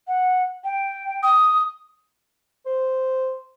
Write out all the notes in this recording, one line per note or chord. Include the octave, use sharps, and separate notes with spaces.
F#5
G5
D#6
C5